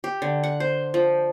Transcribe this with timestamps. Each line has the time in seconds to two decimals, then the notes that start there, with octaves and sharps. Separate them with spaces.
0.04 G4
0.22 D3
0.44 F#5
0.60 C5
0.94 F3